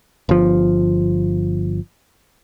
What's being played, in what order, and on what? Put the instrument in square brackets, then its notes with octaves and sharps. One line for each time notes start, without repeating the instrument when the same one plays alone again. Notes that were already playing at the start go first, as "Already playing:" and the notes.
[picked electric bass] G1 F3